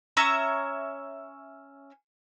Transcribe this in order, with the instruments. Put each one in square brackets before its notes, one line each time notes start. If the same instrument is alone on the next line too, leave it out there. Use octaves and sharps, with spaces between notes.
[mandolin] C#4 C#5 E5 A#5